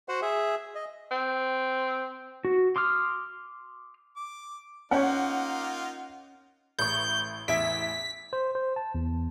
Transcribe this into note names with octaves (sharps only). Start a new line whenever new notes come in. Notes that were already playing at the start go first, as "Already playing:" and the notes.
F#4 C5 F#5
G#4 E5
D#5
C4
F#4
C6 D6 D#6 F6
D6
A#3 C#4 D#4 F4 C#5 F#5 G6
A1 C#6 G6
A1 E2 E5 B6 D7 E7
C5
C5
A5
E2